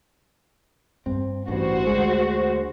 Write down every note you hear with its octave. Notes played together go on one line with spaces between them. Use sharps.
G2 C4
A1 G2 F#4 C5
D2 G3 G#3